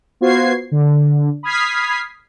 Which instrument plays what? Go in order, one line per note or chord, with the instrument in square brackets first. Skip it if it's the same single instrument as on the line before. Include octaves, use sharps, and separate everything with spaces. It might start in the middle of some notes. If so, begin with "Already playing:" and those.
[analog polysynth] B3 F4 F#4 C5 G#6 C7
D3
B5 D#6 F6 G#6 B6 C7